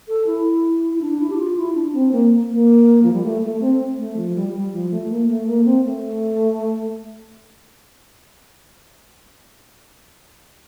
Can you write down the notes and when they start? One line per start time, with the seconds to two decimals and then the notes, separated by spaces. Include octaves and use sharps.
0.08 A4
0.27 E4
0.94 E4
1.01 D4
1.19 E4
1.30 G4
1.38 F4
1.57 E4
1.75 D4
1.93 C4
2.12 A#3
2.50 A#3
3.03 F3
3.13 G3
3.24 A3
3.43 A3
3.61 C4
3.98 A3
4.17 F3
4.36 G3
4.54 G3
4.73 F3
4.91 A3
5.09 A#3
5.27 A3
5.47 A#3
5.65 C4
5.84 A3